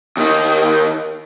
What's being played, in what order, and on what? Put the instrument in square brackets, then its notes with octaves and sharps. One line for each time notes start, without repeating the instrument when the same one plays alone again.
[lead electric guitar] D#2 D#3